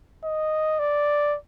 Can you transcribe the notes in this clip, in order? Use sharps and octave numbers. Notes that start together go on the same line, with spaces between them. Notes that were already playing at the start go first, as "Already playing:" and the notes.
D#5
D5